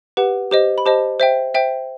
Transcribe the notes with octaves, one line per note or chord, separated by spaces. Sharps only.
G4 B4 F#5
G4 C5 D#5
B5
G4 C5 D#5 A5
C5 E5 G5
C5 E5 G5